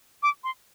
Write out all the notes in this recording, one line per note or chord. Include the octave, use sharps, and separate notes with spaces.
D6
C6